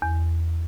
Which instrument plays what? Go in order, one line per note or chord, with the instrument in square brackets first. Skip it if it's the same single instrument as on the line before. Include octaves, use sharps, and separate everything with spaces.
[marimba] E2